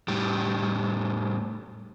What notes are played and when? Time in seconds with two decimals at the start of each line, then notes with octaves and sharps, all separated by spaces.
0.08 A2 G3